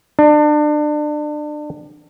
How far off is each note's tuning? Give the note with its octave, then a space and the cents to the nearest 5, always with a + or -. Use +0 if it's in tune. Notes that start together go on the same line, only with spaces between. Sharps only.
D4 +30